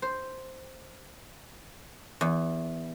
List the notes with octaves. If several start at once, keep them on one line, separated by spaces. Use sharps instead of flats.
C5
E2